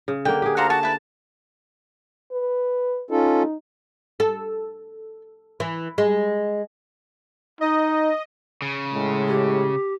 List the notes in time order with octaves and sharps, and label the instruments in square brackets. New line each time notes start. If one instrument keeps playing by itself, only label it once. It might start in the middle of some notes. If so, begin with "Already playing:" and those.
[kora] C#3
[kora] D3 A#3 [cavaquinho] G5
[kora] G4 G#4
[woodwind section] D2 F5 A#5 [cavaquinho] F#5 A5 C6
[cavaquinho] F#4 [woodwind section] A5
[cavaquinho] E4 B4
[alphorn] B4
[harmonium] C#4 F4 A4 [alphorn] D#4
[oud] A4
E3
G#3
[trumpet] D#4 [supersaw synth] D#5
[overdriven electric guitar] C#3
[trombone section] A2 G#3
[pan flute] G4